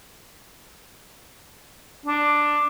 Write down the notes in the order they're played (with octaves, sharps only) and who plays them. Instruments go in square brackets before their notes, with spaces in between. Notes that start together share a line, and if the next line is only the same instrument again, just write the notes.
[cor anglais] D4